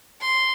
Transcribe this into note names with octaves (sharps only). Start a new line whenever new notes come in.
C6